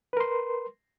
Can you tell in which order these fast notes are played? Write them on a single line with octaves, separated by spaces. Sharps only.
B4 A#4 C6